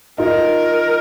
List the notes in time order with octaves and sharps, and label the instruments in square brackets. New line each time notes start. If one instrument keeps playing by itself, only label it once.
[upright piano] D#4 F4 [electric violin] A#4